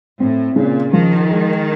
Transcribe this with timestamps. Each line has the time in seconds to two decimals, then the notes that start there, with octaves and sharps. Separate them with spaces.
0.20 A2 C4
0.56 A#2 C#3
0.93 D#3 F3
1.30 G#3